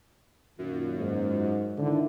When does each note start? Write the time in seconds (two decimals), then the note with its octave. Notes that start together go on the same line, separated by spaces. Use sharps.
0.59 F#2 A#2 D#3 F4
0.99 G#2
1.78 D3 D#3 E4